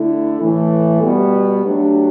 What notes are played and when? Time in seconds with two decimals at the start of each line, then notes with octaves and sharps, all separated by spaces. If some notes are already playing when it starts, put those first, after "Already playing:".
Already playing: D3 A3 E4
0.40 A2 E3 A3
1.02 B2 G3 B3
1.64 F#3 A3 D4 G4